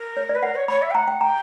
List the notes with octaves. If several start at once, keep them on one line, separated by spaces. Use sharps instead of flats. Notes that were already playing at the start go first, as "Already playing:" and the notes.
Already playing: A#4
C#5
D5
B4
A#4 F#5
C#5
C#5 B5
E5
G5
F#5 A#5
G5
G5 A#5